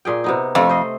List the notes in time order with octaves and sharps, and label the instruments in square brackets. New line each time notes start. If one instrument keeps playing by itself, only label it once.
[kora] A#2 G#4 G5
C3 B3 D#4
[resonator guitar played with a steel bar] F2 [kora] A3 C4
[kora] C5 D#5